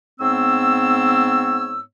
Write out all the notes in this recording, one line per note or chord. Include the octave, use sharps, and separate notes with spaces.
G#2 B3 C4 C#5 E6